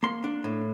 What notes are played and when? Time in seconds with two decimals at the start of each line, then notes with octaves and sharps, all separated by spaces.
0.03 A#3 C6
0.24 D4
0.44 A2